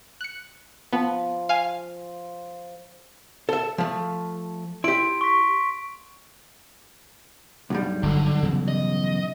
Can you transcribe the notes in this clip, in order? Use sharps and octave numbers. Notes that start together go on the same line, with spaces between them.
F#6 C#7
F3 B3
F5 G#5
A4 E5
F3 A3
E4 G4 C6 D7
C#6 B6
B1 G2 G3
G1 D3
C#3 E3 B3
D#5